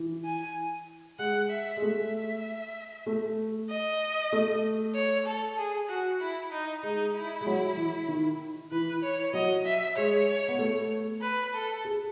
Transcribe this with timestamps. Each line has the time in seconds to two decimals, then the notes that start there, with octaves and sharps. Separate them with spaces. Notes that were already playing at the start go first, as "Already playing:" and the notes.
Already playing: E3
0.25 G#5
1.19 G#3 F#5
1.50 E5
1.77 G#3
1.81 A3 E5
3.06 A3
3.70 D#5
4.32 A3
4.95 C#5
5.26 A4
5.58 G#4
5.89 F#4
6.21 E4
6.52 D#4
6.83 G#3 D#4
7.15 E4
7.41 G#3
7.46 F#3
7.77 E3
8.08 D#3
8.71 E3 B4
9.03 C#5
9.33 F#3 D#5
9.66 E5
9.97 G#3 C#5
10.48 B3
10.59 A3
11.21 B4
11.54 A4
11.85 G#4